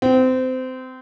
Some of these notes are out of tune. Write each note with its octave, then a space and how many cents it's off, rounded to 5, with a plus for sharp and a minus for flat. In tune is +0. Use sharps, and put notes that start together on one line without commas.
C4 -25